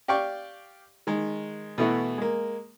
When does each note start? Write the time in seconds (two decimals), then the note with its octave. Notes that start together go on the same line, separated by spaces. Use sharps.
0.08 G4 D5 F5 G5 C#6
1.07 D#3 G#3
1.78 B2 E3 A3 B3 E4 F#4
2.18 G#3 A#3